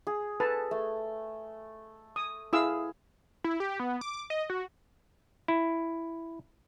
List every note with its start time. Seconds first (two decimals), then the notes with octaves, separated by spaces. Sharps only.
0.07 G#4
0.40 A4 B4 A5
0.71 A3
2.16 D#6
2.53 E4 G#4 F5 E6
3.44 E4
3.60 G4
3.80 B3
4.01 D6
4.30 D#5
4.50 F#4
5.48 E4